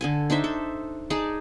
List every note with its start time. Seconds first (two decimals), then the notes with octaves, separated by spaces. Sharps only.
0.01 D3 A4 G#5
0.30 D4 D#4 C5 E5
0.44 A4
1.10 D#4 G#4 D5 A5